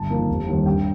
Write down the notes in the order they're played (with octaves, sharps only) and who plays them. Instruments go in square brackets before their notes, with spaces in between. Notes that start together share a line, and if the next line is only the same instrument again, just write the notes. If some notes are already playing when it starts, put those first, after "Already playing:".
Already playing: [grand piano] G1 A5
F2 D#3 A#3
F1
D#2 D#3 G3 C4
G2 G5